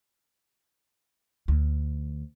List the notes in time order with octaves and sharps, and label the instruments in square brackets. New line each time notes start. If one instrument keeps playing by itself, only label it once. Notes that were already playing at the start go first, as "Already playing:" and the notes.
[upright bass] D2